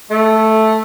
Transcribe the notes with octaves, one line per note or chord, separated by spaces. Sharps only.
A3